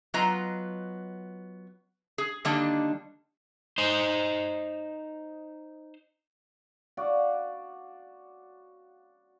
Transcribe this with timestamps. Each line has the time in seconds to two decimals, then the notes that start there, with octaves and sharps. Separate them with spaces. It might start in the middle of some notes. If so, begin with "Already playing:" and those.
0.14 F#3 B3 F4 D#5 A#5
2.18 G#4
2.45 D3 D#3 G3 A#3 D4 D#4
3.78 D#4 C5
6.97 F#4 D5 F5